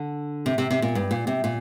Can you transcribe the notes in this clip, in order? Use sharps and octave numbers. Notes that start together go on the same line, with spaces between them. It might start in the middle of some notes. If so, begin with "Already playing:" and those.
Already playing: D3
C3
C3
C3
A#2
G2
A#2
C3
A#2